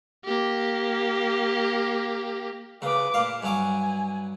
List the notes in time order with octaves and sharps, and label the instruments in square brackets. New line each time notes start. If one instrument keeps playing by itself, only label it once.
[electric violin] A#3 G4
[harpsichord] C#3 [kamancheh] B4 D6
[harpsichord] A#2 F5
[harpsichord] G2 F#3 D6 [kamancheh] G#5